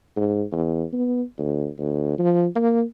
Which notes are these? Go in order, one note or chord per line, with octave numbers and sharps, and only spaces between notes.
G#2
E2
B3
D2
D2
F3
A#3